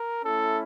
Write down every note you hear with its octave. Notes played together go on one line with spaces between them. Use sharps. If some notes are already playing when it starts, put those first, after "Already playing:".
Already playing: A#4
A3 C#4 E4 A4